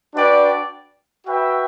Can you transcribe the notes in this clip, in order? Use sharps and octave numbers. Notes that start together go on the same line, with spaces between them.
D4 F#4 B4 D5 G5
F#4 B4 E5 G5